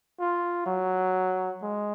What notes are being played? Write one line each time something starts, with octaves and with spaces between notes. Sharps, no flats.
F4
F#3
G#3